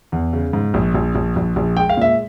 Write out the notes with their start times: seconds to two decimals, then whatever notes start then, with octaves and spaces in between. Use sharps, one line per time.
0.12 E2
0.33 C#3
0.53 G#2
0.74 A#1
0.94 A#1
1.15 A#1
1.36 A#1
1.56 A#1
1.77 G#3 G5
1.89 F5
1.97 A#2 E5